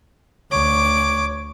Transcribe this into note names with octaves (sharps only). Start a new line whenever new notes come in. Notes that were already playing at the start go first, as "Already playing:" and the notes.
D2 C#5 D6